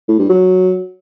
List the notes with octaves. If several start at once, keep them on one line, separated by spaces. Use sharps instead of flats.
A2
G2
F#3